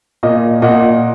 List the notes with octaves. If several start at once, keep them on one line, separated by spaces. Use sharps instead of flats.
A#2 D#5
A#2 D#5 F#5